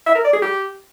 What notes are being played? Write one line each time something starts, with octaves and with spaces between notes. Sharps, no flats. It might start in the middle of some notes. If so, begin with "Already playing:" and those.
E5
A#4
D5
G#4
G4